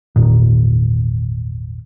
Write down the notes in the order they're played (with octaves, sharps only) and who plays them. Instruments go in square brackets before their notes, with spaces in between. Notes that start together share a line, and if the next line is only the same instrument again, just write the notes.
[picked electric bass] G#1 E2 A#2 D#3